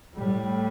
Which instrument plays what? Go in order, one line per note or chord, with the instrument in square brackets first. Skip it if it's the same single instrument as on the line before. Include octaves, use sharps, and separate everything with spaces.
[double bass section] A2 G3